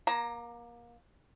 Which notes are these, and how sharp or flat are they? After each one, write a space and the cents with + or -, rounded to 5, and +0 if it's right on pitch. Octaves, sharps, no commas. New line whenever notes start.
A#3 +30 A#5 +0